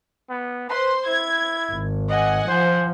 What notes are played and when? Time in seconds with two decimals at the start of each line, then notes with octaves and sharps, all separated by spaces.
0.30 B3
0.70 B4 C5 C6
1.08 E4 G#6
1.72 G#1
2.10 D#5 F#5 G#5
2.48 F3 C5